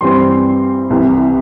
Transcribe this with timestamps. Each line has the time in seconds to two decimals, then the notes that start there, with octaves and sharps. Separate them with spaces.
0.01 G2 E3 G3 C4 C6
0.90 C2 C3 E3